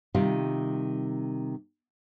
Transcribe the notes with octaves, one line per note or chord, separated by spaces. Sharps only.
C3 D#3 G3 F4